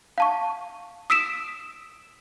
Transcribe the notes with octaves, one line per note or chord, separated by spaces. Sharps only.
F5 A5 C#6
D#6 E6 B6 D7 E7